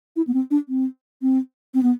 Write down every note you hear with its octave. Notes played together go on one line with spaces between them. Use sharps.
E4
B3
C4
D4
C4
C4
C4
B3